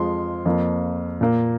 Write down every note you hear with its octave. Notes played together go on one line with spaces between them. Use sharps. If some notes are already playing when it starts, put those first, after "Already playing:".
Already playing: F2 F3 G#3 C6
F2 F3 A#3
A#2 A#3